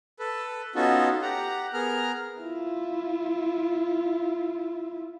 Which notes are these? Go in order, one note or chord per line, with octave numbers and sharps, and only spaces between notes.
A4 B4
B3 C#4 D#4 F4 F#4 A4
G4 F#5 A#5
B3 G#4 A#4 A#5 F6
E4 F4